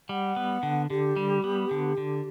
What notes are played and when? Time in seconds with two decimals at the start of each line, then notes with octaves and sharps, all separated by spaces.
0.09 G3 F#5
0.36 B3
0.63 D3
0.90 D3 G4
1.16 G3
1.44 B3
1.71 D3
1.98 D3